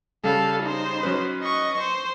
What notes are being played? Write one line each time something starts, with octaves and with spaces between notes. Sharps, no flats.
C#3 G3 A4 F5
D#4 C5
F#3 C#4 B4
D#5 C#6
C5